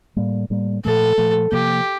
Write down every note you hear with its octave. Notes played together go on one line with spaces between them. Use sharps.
A2 G3 A#3
A2 G3 A#3
A#2 F3 A3 A4
A#2 F3 A3
C3 F3 A#3 G4